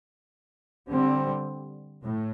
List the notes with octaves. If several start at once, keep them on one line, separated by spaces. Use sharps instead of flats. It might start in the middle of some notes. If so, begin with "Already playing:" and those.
D3 G3 C4
A2